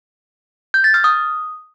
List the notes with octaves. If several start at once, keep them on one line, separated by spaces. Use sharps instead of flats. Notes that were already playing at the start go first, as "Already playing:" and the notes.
G6
A6
F6
D#6